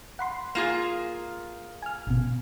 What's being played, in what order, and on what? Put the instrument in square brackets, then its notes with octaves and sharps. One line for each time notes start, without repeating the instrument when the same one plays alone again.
[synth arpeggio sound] F#5 B5 C6
[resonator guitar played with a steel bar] A#3 F4 G#4
[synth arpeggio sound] G#5 F6
G#1 B2